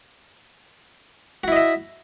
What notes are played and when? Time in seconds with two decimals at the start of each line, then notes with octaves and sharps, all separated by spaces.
1.44 F#4
1.48 E4
1.52 D#5
1.56 E5